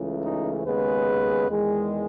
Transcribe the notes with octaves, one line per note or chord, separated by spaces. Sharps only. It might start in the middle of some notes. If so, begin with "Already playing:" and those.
Already playing: C#2 C#3 E3 A3
D#4
D#2 C#3 G#3 B3 B4
E2 D#3 G#3